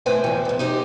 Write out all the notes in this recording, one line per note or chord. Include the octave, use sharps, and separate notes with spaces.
A2 A3 B4 C5 G5 G#5
E2 F3
D2 G#2
D#4 G4 C5